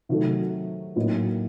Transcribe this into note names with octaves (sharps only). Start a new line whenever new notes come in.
C3 D#3 F#3 A3
A2 F#3 A#3 D#4